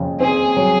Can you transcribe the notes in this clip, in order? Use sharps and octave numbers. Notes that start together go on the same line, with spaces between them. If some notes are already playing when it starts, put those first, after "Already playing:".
Already playing: F2 C#3
C4 G#4
F#3